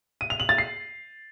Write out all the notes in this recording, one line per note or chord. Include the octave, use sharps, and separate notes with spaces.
D#7
F7
F#7
A6
C7